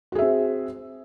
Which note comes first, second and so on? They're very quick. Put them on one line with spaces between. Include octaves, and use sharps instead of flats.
F#4 G#4 E5 C4